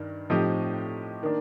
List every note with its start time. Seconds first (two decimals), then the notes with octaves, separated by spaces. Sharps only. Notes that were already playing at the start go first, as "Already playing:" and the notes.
Already playing: G2 D#3
0.30 A2 F3 C4 D#4 G4
1.23 D#3 A#3 D4